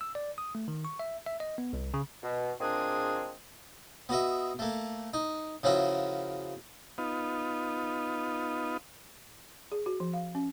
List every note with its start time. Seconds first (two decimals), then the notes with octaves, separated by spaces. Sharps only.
0.01 E6
0.15 D5
0.38 D#6
0.55 A3
0.68 D#3
0.85 C#6
1.00 E5
1.27 E5
1.40 D#5
1.58 B3
1.73 C2
1.94 C#3
2.23 B2
2.61 A#2 G#3 C4 D4 G#4 D#6
4.09 B3 F#4 D#5 E5
4.59 A3 A#3
5.14 D#4
5.63 C#3 F3 C#4 E4 F#4 A#4
6.98 B3 D#4 F4
9.72 G#4
9.86 F#4
10.00 F3
10.13 F5
10.35 C#4